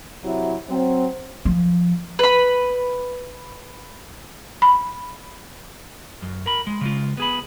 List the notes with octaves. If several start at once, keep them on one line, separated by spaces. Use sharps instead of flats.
C3 F#3 E4
F#3 C4
F3
B4 B5
B5
F#2
A#4 B5
G#3
C#3 G#3 F4
B3 G#4 B5